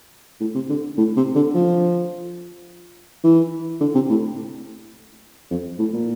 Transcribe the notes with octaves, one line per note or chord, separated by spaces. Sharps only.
A2
C3
D3
A2
C3
D3
F3
E3
D3
C3
A2
F2
A2
A#2